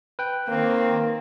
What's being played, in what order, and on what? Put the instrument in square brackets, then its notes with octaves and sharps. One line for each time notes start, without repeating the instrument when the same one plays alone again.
[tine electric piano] B4 G5
[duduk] D#3 [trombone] A#3 [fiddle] C4